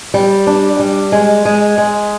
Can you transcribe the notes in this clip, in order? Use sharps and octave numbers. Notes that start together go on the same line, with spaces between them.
G3
D4
G3
G#3
G#3
G#3